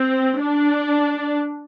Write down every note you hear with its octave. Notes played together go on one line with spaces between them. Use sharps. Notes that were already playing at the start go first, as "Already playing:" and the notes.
Already playing: C4
D4